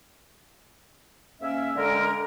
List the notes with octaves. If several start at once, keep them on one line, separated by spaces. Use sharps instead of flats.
G#2 A#3 C#4 E5
D3 G#3 C#4 A#4